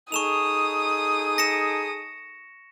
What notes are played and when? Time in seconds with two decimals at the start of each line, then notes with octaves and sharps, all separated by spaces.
0.12 D#4 G#4 A4 C#6 D#6 E7 F7
1.38 A#6 C#7 E7